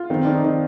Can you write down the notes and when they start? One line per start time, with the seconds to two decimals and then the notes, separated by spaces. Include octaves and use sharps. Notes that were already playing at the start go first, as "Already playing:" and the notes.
Already playing: F4
0.10 D#3 C4
0.25 D#3 D4
0.32 D#4
0.44 D#3 D#4